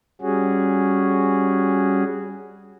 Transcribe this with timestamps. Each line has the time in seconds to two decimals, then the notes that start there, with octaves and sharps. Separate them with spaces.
0.21 G3 C#4 F#4 G#4